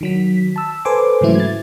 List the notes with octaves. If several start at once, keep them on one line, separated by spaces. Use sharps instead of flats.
D#3 F#3 B6
A5 E6
A4 B4 C5 G#5 C6 D6
G#2 C#3 E3 F#3 A3 E4
G#6 A6